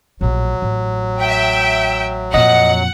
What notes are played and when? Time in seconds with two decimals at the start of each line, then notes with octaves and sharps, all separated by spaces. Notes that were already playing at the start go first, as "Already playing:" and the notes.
0.21 A#1 A2 F#3
0.62 A1
1.20 E5 G5
2.34 F2 A#2 D#5 F#5